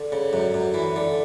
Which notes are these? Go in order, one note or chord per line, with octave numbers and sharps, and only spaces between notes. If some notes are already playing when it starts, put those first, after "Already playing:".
Already playing: D3
C#3
F#2
F#2
E3
D3